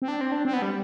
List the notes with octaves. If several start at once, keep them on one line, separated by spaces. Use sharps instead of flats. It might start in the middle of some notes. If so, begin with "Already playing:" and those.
C4
D4
C4
D4
C4
B3
G3